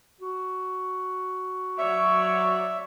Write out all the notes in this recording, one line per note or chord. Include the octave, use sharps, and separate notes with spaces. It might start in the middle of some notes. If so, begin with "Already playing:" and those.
F#4
F#3 C#5 D5 E5